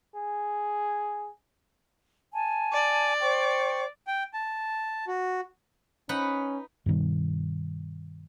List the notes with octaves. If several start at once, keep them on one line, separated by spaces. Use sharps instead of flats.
G#4
G#5 A5
D5
C5 G5 C#6
G5
A5
F#4
C#4 D#4 B4 F#5
G2 B2 D#3 G3